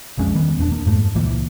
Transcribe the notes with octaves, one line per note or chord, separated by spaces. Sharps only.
B1 F2 G#3 C#4
D#3 G3 B3
D#1 E2 C4 D4
A#3
F2 G#2 A3
C#2 A#2 E3 A#3